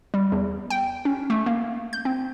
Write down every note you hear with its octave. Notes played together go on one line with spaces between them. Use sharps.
G3
E2
G5
C#4
A3
A#3
G6
C4